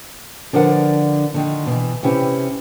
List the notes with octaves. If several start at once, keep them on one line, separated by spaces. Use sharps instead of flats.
D3 F3 D4 A#4 B4 F#5
D3 D#3
B2 D#3 E3
C3 C#4 E4 G4 B4